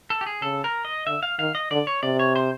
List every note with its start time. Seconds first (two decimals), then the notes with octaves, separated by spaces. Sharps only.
0.10 A4
0.21 G4
0.26 G#4
0.42 C#3 A4
0.64 A#4
0.85 D#5
1.07 D3 E5
1.23 F5
1.39 D#3 F5
1.55 D#5
1.71 D3 D5
1.87 C#5
2.03 C3 D5
2.19 C#5
2.36 C5